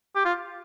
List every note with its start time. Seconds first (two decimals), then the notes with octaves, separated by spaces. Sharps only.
0.16 G4
0.25 F4